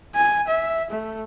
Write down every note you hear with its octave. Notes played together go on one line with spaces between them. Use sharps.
G#5
E5
A3